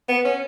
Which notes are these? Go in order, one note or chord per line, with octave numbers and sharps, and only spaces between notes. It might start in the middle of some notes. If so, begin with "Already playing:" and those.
B3
C#4